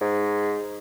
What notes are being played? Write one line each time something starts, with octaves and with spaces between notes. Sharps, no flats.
G#2